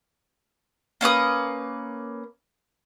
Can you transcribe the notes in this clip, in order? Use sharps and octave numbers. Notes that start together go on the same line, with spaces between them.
A#3 C#4 B4 D#6